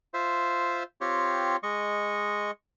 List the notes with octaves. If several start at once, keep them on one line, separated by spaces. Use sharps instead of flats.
F4 C5 E5
C4 F4 G4 C#5
G#3 D#5 C#6